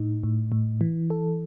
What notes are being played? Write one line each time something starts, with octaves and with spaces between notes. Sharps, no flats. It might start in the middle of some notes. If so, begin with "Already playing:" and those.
Already playing: A2 D#4
A2
A2
E3
A4